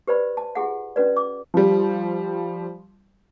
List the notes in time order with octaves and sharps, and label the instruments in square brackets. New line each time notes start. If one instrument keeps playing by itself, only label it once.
[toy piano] G4 B4 C5 D5 B5
A5
F4 G4 G#4 F#5
C#4 F#4 B4 D5
D6
[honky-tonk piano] F3 G3